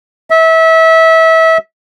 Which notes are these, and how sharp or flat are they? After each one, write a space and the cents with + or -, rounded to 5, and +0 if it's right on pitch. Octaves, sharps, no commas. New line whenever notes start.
E5 -25